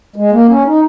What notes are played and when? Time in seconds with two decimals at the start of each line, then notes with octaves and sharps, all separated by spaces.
0.16 G#3
0.32 A#3
0.49 C#4
0.66 D#4